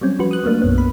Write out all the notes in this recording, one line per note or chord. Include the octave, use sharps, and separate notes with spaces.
F#3 G3 C4 C#4
F3 G3 F#4 B4
D#6 F#6
F#3 A3 A#3 D4
B1 F#2 B3
B5